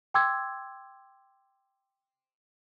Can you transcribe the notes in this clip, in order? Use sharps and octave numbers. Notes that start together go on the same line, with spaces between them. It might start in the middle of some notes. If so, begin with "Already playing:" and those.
G5 C6 D6 E6 G#6